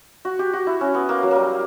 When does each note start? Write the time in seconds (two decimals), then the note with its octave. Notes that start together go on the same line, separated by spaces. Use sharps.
0.25 F#4
0.39 G4
0.53 F#4
0.67 E4
0.81 C#4
0.94 B3
1.09 A#3
1.23 F#3
1.31 G3 A#3